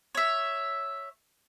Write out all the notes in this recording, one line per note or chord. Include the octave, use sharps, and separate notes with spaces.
C#5 E5